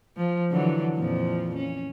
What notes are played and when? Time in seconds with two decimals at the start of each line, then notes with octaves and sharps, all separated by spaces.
0.17 F3
0.52 D3 E3 F#3
0.96 F2 A#2 F3
1.56 C#4